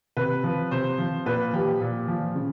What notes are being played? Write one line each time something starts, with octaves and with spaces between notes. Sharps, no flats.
C3 B4
F3
C3 C5
F3
A#2 B4
F3 G4
A#2
F3
C#3